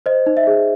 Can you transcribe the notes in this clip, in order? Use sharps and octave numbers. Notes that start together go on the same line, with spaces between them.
C5 D#5
D#4
E5
G#4